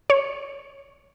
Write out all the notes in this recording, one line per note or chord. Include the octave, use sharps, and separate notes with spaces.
C#5